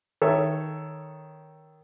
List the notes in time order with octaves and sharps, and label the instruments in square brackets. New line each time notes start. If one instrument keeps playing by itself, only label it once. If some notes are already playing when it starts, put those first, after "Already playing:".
[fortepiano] D#3 A4 C#5 E5